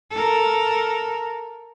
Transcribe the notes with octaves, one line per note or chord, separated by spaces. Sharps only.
A4 A#4